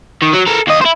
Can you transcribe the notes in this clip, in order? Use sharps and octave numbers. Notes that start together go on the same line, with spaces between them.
D#3
F#3
A4 A#4
D#2 D#5
E4 C5